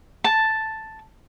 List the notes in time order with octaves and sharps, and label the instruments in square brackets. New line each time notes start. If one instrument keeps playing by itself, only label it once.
[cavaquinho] A5